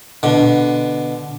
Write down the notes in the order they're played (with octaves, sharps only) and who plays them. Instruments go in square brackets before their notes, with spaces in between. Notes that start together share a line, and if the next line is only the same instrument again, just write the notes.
[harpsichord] B2 D3